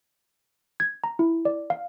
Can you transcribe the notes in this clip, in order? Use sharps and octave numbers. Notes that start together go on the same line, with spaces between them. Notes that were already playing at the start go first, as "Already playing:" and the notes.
G#6
A#5
E4
D5
F5